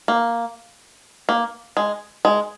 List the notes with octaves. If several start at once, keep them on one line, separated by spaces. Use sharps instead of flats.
A#3
A#3
G#3
G#3